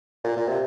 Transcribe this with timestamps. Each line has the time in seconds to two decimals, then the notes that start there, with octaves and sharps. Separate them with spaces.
0.24 A#2
0.37 A#2
0.48 C3